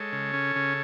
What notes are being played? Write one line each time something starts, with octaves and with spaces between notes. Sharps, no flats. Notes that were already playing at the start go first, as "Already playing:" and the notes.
Already playing: G#3 A4 C#5
C#3
C#4
C#3